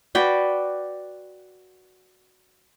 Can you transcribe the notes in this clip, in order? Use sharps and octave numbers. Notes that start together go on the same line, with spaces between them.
F#4 B4 D5 G5